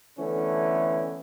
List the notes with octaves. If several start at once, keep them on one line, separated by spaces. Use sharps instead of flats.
D3 E3 A3 B3 C#4